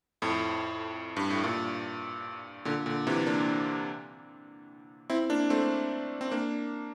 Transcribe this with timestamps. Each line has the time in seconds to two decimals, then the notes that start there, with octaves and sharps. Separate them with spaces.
0.22 F2 A2
1.17 G2
1.30 A2
1.44 G2 A#2
2.65 A#2 D3
2.86 A#2 D3
3.07 C3 E3
3.26 A#3 D4
5.10 C4 E4
5.30 A#3 D4
5.50 A3 C4
6.21 C4
6.31 A#3 D4